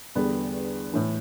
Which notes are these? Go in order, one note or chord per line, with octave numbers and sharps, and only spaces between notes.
E2 D3 G3 B3
A2 E3